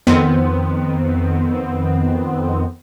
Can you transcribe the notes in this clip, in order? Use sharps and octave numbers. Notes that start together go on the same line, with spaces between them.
F2 D#3 B3 C4